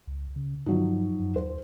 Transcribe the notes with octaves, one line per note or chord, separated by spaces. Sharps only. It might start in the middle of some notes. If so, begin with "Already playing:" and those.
C#2
C#3
G2 F3 F#3 D#4
F#2
D#2 C5